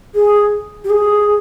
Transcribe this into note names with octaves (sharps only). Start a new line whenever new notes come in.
G#4
G4
G#4